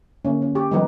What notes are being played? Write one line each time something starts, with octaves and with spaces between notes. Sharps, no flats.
D3 A#3 C#4
C#4
G4
D#3 F3 G3 B3 D#4 B4